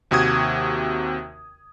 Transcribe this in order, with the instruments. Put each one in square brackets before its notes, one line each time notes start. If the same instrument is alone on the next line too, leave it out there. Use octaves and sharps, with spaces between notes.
[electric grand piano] D#2 C3 F#4 D#6 G#6